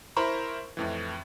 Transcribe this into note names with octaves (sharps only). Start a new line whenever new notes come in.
E4 A#4 C5 A#5 B5 C#6
F2 A2 E3